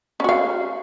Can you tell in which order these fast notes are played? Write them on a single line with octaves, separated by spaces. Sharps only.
C#4 F#4 F5